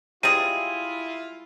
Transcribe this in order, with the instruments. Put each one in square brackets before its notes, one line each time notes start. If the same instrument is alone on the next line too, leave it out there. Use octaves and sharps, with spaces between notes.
[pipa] G3 G#3 G#4 [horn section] E4 F4 [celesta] D#7